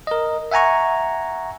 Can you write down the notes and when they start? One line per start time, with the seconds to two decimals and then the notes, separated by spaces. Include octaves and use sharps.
0.07 A#4 D#5
0.51 E5 F#5 G#5 A#5 C#6